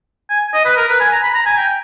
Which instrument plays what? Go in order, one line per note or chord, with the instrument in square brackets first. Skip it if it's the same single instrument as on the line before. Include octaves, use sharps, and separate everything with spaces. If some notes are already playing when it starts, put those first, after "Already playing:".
[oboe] G#5
D#5
B4
A#4
B4
G#5
A#5
B5
A#5
G#5
G5